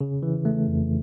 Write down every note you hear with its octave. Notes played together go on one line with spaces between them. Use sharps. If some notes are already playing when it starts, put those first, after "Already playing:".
C#3
E3
A3
F2